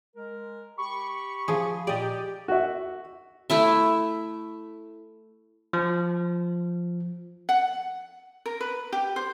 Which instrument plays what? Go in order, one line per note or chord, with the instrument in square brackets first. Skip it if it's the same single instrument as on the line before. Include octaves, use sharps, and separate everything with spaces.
[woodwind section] G#3 A#4
[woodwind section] G4 B5 [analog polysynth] C#6
[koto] F3 G#4
[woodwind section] A#2 [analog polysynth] G4 [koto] D5 D#5
[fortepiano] F#4 E5
[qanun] A3 E4 E5
[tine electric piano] F3
[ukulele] F#5
A#4
B4
G4
C5